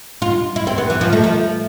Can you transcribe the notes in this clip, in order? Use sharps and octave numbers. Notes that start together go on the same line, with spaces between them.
F4
E4
C4
B3
E3
F3
A3
F3